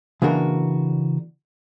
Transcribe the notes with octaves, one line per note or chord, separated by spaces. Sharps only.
C#3 E3 A#3 D4 F#4 A#4